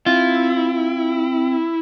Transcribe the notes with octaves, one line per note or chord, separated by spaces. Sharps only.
C4 E4 F4